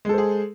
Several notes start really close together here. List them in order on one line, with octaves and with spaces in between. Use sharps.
G#3 A4 C5 G#4